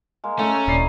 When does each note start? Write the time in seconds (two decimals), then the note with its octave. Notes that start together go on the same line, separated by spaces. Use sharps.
0.24 G#3 A#3
0.39 A3 C#4 A4 E5 A#5
0.68 D1 A#2 D#4 E4 D5 C7